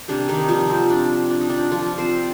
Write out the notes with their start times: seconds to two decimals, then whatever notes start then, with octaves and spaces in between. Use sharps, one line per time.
0.08 C3 G3 A#3 D4
0.29 D#3 D#4
0.49 F3 F4
0.70 C4
0.90 D4
1.30 D4
1.41 D#4
1.50 D4
1.71 F3 F4
1.98 C4 C5